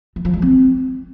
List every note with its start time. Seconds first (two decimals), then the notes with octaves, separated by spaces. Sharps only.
0.16 E3
0.25 F3
0.33 G#3
0.42 C4